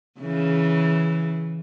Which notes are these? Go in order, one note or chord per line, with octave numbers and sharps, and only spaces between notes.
C#3 E3